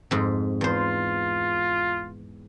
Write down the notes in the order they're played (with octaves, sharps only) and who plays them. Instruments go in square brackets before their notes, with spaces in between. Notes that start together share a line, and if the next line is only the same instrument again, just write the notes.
[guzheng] F2 G#2
[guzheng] E2 C5 [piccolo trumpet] F4